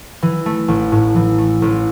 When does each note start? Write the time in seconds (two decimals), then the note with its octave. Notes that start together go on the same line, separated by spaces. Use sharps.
0.22 E3
0.46 A3
0.68 A1
0.92 A2
1.16 E3
1.38 A3
1.62 A1